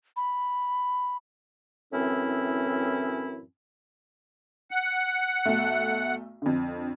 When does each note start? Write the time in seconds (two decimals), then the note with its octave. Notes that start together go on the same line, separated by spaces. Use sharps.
0.17 B5
1.92 F#2 A2 E3 C4 C#4 E4
4.71 F#5
5.46 B1 A3
6.42 F2 D3